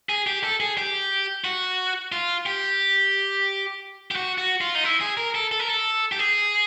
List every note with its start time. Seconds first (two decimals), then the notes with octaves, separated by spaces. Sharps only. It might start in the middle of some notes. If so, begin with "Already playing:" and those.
0.09 G#4
0.27 G4
0.43 A4
0.60 G#4
0.77 G4
1.44 F#4
2.12 F4
2.46 G4
4.11 G4
4.16 F#4
4.38 F#4
4.61 F4
4.75 D#4
4.84 E4
5.01 G#4
5.17 A#4
5.35 A4
5.51 A4
5.59 A#4
5.68 A4
6.12 G4
6.19 G#4